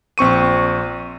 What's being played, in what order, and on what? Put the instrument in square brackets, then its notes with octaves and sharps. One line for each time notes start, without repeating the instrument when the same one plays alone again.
[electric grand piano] A#1 C4 C#6 D#7